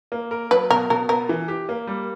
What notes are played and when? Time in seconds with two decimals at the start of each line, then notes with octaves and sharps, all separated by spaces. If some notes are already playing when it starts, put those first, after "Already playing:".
0.12 A#3
0.31 A#4
0.51 F#3 B4
0.71 B2 A#4
0.90 B2 A#4
1.09 B3 A#4
1.29 E3
1.48 G4
1.69 A#3
1.87 G3